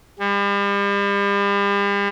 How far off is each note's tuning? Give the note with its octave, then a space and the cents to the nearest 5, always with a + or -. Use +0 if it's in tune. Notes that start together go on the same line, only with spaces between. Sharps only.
G3 +40